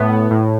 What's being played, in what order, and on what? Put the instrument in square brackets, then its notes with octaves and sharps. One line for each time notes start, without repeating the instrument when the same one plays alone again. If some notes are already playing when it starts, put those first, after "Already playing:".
Already playing: [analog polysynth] A2 B3
A2